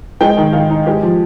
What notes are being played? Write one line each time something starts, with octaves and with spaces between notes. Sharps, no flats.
G#3 G5
D#3
D#3 F5
D#4
G#3 G4
F3